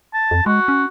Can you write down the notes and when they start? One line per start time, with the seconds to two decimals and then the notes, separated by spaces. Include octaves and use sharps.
0.14 A5
0.31 F2
0.46 G#3 F#4
0.68 C#4